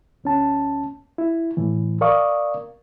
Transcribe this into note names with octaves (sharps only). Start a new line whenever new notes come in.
D2 C#4 A5
E4
A2 E3
A#4 D5 F5 C#6 D#6